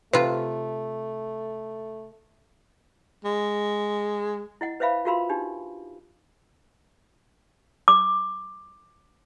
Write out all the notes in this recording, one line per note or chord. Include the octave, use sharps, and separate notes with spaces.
C3 A3 F4 B4
G#3
E4 D#5 F#5
B4 C5 E5 F5 B5
F4 F#4 A#4 F5 B5 C6
D4 D#4 G4
D6